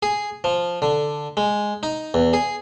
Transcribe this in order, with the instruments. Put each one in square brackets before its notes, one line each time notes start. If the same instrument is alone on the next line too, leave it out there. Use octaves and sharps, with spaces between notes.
[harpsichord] G#4
F3
D3
G#3
D#4
E2
G#4